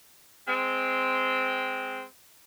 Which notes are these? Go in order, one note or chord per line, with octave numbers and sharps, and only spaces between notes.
G#3 C4